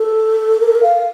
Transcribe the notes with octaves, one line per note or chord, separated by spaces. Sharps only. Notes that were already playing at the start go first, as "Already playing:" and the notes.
Already playing: A4
A#4
A4
A#4
F5